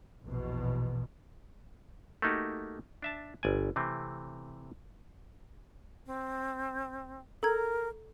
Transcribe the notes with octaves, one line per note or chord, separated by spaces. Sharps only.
A#1 E2 B2
A3 A#3 D#4 F#4 G4
D4 E5 A5
G1 D5 G#5
C3 E3 A3 C4
C4
A4 A#4 A#5 G#6